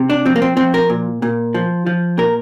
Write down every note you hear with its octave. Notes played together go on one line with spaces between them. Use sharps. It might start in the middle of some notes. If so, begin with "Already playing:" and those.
Already playing: C3
D4
F3 C4
A#3
C4
F3 C4
A#4
A#2
A#2
F3
F3
A#2 A#4